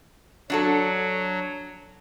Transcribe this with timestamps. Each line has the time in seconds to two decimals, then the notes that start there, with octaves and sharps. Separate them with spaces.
0.50 F#3 D4 F#4 A4